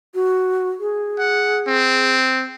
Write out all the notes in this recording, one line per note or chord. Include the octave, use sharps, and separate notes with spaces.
F#4
G#4
F#5
C4